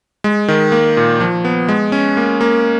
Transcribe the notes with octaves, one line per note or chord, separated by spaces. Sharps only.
G#3
D#3
A#3
A#2
F3
B3
G#3
C#4
A#3
A#3